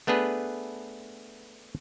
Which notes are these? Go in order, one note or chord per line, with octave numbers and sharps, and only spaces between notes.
A3 B3 D4 G#4 B4